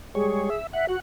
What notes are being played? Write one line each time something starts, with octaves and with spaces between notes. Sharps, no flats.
G3 G#3 G#4 C#5
E5
E5 F#5
F#4 F#5